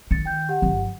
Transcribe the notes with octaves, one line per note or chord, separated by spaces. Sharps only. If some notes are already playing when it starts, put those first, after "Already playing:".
D#3 A6 C#7
G5 G6
G4 F#5
G1 F3